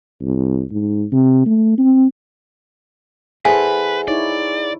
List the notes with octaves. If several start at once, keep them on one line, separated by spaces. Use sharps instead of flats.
C2
G#2
C3
A3
C4
E2 A4 B4 C5 G#5
D#4 E4 C#5 D5